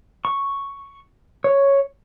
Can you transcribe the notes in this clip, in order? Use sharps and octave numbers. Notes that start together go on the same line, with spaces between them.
C#6
C#5